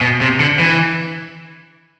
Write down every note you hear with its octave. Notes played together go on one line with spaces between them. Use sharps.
B2
C3
D3
E3